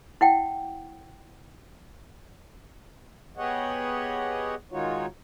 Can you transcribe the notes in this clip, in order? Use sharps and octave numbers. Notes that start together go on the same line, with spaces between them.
E4 F#5 G5
B3 G4 G#4 C#5 D#5 F#5
D#3 G#3 D#4 F4 F#4 C#5